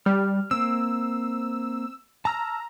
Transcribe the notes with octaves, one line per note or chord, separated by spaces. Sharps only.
G3 F6
A#3 C4 E6
A5 A#5 E6 F6